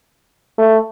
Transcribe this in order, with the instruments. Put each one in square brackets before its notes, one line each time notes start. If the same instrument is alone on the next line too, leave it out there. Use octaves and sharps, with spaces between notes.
[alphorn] A3